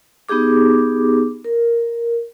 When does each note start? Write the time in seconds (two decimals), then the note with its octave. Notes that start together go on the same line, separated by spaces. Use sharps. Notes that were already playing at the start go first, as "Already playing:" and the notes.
0.29 B3 D#4 G4 G#4 D6
1.45 A#4